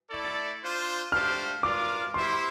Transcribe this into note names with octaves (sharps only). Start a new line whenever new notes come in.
A3 E4 A4 D5
D4 F4 C5
A3 D4 G4 C5 F5 F6
D4 F4 A#4 D5 F5 D6
A#3 E4 G4 C5 E5 C6